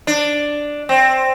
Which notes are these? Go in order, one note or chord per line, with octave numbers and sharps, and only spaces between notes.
D4
C4